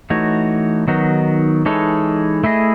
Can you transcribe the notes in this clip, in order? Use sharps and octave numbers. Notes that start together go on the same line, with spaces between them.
E3 A3 D#4 F#4 C#5
D#3 F#3 B3 D#4 F#4
E3 G#3 D#4 A4 C#5
A3 E4 G#4 D#5